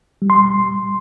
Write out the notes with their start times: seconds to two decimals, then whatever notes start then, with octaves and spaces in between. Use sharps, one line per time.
0.22 G3
0.30 C6